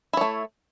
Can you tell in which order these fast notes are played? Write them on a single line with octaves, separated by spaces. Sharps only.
E4 C#5 A3